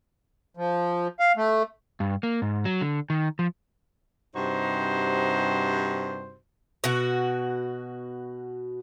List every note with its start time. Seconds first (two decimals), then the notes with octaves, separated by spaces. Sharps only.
0.57 F3
1.20 F5
1.37 A3
2.00 G2
2.23 A#3
2.42 G#2
2.65 F#3
2.81 D3
3.10 D#3
3.39 F3
4.35 G2 C3 D#4 F#4 C5
6.84 B2 F#4